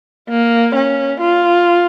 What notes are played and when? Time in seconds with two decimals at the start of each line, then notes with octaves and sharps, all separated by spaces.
0.29 A#3
0.75 C#4
1.21 F4